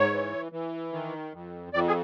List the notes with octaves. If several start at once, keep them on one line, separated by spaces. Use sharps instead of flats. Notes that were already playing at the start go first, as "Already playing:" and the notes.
Already playing: G#2 C#5
E3
E3
D#3
F2
F2 D5
G#4